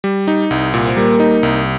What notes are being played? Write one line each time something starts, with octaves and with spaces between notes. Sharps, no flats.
G3
D#4
C2
A#2
C5
G3 A#3 A#4
D#4
C2